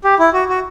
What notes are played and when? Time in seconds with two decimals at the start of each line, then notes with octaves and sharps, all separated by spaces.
0.04 G4
0.19 E4
0.34 F#4
0.49 F#4